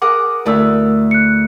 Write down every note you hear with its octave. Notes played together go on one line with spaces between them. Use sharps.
G#4 A#4 F#5 D6
D2 A3 E4 A#4 E6
F#6 C#7